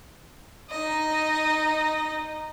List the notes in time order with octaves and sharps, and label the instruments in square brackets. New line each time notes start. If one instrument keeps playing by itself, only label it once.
[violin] D#4 D#5